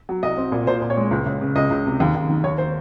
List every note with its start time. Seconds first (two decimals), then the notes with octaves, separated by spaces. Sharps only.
0.09 F#3
0.23 C2 D#5
0.38 C4
0.52 A#2
0.67 A#2 C5
0.82 A#2
0.90 C#5
0.97 G#3
1.11 C#2
1.26 C#2
1.41 C#3
1.56 C#2 D#5
1.70 C#2
1.86 C3
2.00 D#2
2.15 D#2
2.29 D#3
2.44 D#2 C#5
2.58 C5